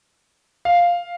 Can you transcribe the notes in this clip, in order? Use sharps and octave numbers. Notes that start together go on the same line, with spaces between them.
F5